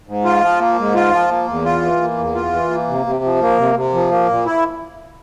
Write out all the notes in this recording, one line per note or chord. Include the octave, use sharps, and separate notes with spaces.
G#2
F4
F3
A#3
G#2
F4
F3
A#3
E2
F4
E3
A#3
E2
F4
E3
A#3
C3
C3
F3
A#3
C3
C3
F3
A#3
A#2
E4